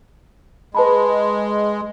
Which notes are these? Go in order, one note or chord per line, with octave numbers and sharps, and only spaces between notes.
G#3 B4 A5 B5